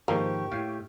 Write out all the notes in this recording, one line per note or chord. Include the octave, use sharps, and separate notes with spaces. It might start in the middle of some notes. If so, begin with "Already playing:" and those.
G#2 D#3 F3 A#3 G4 C#6
A2 F5